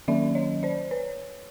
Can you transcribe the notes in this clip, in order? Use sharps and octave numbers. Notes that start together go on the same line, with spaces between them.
D#3 F#3 A#3 C#4 D5 E5
C#5 D#5
C5 D5
B4 C#5